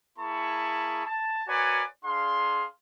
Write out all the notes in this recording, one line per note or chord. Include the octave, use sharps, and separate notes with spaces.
A#3 E4 G#4 A5 B5 C#6
A5
F#4 A#4 B4 C#5 D5 G#5
D4 G#4 F5 C6